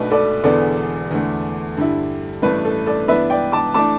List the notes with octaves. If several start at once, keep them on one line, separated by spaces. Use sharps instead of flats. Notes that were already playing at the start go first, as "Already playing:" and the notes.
Already playing: B1 B2 A3 D4 B4
A4 D5
E1 E2 D3 B3 A4 D5
E2 D3 A3
G2 D3 G3 E4
A1 G2 E3 A3 D4 B4
A4
A4 D5
G2 E3 B3 D4 B4 E5
D5 G5
A5 D6
E3 A3 D4 A5 D6